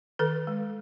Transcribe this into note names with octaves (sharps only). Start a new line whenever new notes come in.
D#3 A4 B4
G#3